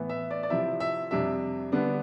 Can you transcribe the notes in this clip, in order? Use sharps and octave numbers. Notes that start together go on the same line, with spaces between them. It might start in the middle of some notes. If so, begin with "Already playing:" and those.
Already playing: A2 E3 B3 E4
E5
D5
D5
C3 F3 C4 E4 E5
E5
F2 C3 G3 D4 E5
D3 G3 B3 D4